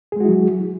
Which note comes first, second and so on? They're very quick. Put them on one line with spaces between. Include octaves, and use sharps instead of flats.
G#4 G#3 F#4 E4 F#3